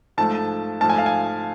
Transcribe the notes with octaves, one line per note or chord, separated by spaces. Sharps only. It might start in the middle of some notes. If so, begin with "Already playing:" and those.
G#2 F3 A3 A5
G#2 F3 A3 A5
G#5
F5
G#5